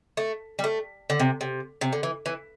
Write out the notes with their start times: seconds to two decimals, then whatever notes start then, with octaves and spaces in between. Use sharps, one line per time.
0.17 A3
0.59 G3
0.64 A3
1.10 D3
1.20 C3
1.41 C3
1.81 C3
1.93 D3
2.03 E3
2.26 E3